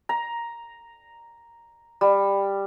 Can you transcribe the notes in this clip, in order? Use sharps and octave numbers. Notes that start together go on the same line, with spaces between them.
A#5
G3